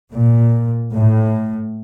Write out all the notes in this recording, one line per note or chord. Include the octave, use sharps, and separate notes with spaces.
A#2
A2